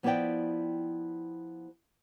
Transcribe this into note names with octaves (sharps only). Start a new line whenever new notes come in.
F3 B3 E4 G4 D5 G5